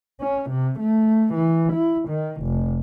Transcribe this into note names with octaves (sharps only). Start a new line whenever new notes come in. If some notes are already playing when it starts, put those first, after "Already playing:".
C#4
C3
A3
E3
E4
D#3
F1